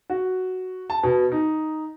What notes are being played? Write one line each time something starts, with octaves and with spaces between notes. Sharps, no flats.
F#4
A5
B2
D#4